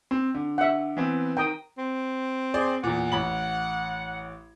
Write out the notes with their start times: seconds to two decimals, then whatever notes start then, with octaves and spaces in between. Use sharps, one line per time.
0.11 C4
0.35 D3
0.58 E5 F#5
0.97 E3 B3 C4
1.37 D#3 G5 A#5 D#6
1.78 C4
2.54 G#4 C5 D5
2.84 E2 A#2 F#5
3.12 A1 B5 F#7